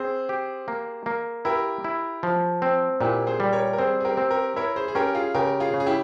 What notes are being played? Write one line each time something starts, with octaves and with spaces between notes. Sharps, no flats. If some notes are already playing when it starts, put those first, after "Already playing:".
Already playing: C4 G#4 C5
G4
A#3
A#3
E4 G4 A#4
E4
F3
C4
A#2 E4 G4
G#4 C5
G3
A#4 C#5
A#4
C4 G#4 C5
G#4
G4 A#4
C4
G4 A#4
E4 A#4 C#5
G#4 C5
G#4
C#4 G4 A#4
F4 G#4
C#3 G4 A#4
F4 G#4
C#3
G#4
E4 G4